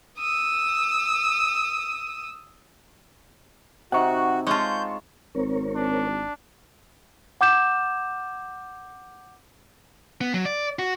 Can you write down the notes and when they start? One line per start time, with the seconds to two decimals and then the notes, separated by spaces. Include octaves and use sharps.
0.19 D#6 E6
3.92 C3 D#4 F#4 F#5 C#6
4.47 G#3 F4 C#5 A5 C#6 G6
5.35 G#1 C4 A#4 C#5
5.76 D4
7.41 F#5 D6 G6 E7
10.21 B3
10.34 F#3
10.45 D5
10.79 F#4